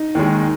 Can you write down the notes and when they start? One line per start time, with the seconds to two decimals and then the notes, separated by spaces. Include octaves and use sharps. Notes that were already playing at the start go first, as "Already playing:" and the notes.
Already playing: D#4
0.15 D#2 D#3 G#3